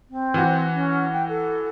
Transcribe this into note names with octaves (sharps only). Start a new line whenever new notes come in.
C4
E3 F#4
C#4
G5
A4